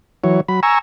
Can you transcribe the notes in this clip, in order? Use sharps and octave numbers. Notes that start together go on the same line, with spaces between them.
E3 F#3 C#5
F#3 B5
G#5 A#5 C#6 E6